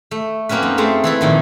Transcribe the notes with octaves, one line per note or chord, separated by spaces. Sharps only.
A3
F#3 A#3 C4 C#4 B4
F#2 D#4
G#3 A3 C4 C5
E3 E4 A4
A#2 D#3 F3